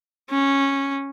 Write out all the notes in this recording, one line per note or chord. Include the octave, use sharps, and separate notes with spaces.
C#4